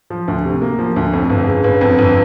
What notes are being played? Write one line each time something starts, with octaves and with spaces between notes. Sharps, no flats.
F3
D2
C3
A#3
F3
D2
F2
G1
C#3
G1
F2
G1